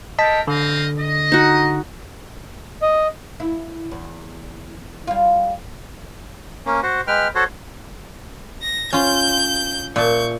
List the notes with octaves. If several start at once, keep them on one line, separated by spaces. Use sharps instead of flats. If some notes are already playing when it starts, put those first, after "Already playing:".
A4 A#4 D#5 G5 A5 B6
D3 C4 D#5 F5
D#5
D#4 F#4
D#5
E4
E2
G3 F4
A#3 C#4
F#4 C5
G#3 B4 G5 F6
F#4 A4 C5 C#5
A#6
C#4 F4 G6
A#2 E5 A5 C#6 G6